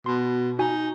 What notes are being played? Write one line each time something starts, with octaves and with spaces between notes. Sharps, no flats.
B2 C6
D#4 F#4 G#5